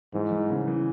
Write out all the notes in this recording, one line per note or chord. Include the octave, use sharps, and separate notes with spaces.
G#2 E3
E3
C#3
E3